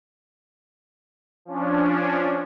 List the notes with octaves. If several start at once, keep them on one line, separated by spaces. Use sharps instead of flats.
F3 C#4 D4